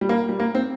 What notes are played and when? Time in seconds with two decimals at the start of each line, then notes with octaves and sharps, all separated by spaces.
0.01 G3
0.09 A#3
0.29 G3
0.40 A#3
0.55 C4